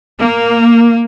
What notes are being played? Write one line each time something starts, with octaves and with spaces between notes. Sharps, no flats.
A#3